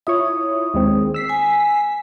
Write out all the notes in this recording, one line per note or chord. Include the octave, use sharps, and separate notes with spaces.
E4 F4 C#5 D#6
D#2 G#3 C4
E6 B6 C7
G#5